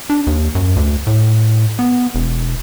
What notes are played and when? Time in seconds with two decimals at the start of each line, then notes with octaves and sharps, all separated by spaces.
0.10 D4
0.27 D#2
0.55 F#2
0.76 D2
1.07 A2
1.79 B3
2.15 E1